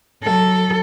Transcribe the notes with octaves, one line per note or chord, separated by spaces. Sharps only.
F#3 A4